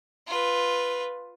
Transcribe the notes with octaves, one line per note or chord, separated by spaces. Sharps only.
F4 B4